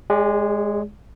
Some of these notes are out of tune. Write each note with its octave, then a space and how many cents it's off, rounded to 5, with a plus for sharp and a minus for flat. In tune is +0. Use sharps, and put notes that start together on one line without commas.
G#3 +0 G4 +45 D5 -35